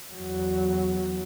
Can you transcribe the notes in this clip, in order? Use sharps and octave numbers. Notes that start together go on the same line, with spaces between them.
E2 F#3